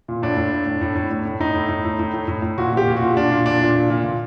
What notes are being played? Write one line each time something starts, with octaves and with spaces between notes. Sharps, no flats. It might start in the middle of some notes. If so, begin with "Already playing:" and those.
A#2
A2 D4
A2
A2
A2
A2
A2
A2
A2
A2 D#4
A2
A2
A2
A2
A2
A2
A2
A#2 F#4
A#2 G4
A#2
F#4
A#2
A#2 D4
A#2
A#2 D4
A#2
A#2
A#2
A#2